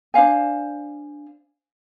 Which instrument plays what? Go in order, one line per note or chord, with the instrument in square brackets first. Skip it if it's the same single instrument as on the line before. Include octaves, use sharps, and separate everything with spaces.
[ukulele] D4 C5 F5 G#5